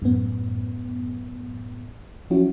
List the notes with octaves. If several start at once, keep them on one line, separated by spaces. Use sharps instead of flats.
F#2 A2 B3
F3 F#3 C#4 E4 F#4